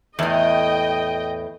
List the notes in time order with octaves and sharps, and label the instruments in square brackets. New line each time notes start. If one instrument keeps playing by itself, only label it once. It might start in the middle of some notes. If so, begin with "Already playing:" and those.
[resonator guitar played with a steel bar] E2 A2 [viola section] D#5 G5